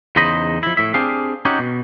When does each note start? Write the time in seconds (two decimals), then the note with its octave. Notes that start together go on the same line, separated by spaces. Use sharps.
0.16 E2 C#3 D#4 C5 D#5 B5
0.63 F3 E4
0.77 A2 E5
0.94 C4 D4 G4 G#4 F5
1.45 C#4 D#4 F#4 G4
1.59 B2